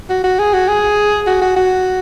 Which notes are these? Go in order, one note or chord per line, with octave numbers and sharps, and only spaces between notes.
F#4
F#4
G#4
F#4
G#4
F#4
F#4
F#4